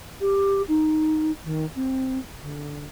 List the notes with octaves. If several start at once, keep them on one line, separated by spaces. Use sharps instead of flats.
G4
D#4
D#3
C4
D3